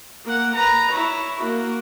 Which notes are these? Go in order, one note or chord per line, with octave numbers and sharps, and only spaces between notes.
A#3 F#5
B4 A#5
E4 C#5
A#3 F#4